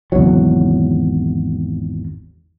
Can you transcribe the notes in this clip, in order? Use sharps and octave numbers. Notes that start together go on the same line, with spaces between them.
G#1 E2 C#3 F#3